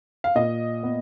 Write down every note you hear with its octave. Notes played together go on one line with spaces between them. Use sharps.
F5
A#2 D#5
B3